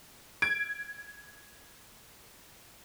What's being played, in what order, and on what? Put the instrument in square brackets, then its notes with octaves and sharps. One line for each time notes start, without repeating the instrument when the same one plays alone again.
[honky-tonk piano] G#6 D7